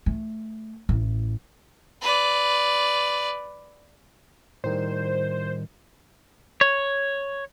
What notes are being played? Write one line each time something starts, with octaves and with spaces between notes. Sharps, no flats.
A3
A1
B4 D5
A2 D#3 G3 C5
C#5